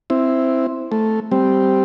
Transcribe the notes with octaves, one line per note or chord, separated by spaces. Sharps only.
C4 E4
A3
G3 C4